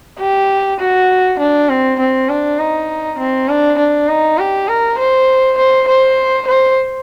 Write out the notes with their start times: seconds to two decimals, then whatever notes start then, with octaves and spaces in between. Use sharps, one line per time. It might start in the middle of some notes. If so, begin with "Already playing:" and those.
0.19 G4
0.80 F#4
1.39 D4
1.69 C4
1.99 C4
2.29 D4
2.59 D#4
3.19 C4
3.49 D4
3.78 D4
4.08 D#4
4.38 G4
4.68 A#4
4.98 C5
5.58 C5
5.88 C5
6.47 C5